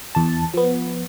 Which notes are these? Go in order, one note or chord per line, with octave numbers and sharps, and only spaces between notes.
E2 A5
F3 B3